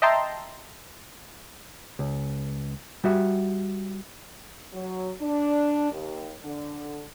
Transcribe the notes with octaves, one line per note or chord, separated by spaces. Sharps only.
D#5 E5 G5 A5 A#5 C6
C#2
G3 F#4 E5
F#3
D4
D#2
D3